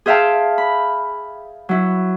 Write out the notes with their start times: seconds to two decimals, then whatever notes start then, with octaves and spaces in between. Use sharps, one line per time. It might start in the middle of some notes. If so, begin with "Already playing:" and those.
0.06 G#4 C5 E5 F5 G5 A5
0.58 B5
1.69 F#3 E4